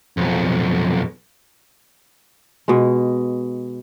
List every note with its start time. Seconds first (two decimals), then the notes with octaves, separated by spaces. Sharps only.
0.17 B1 F2
2.68 B2 G#3